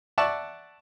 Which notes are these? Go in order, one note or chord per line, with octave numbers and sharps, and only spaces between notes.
D5 E5 F#5 A5 C#6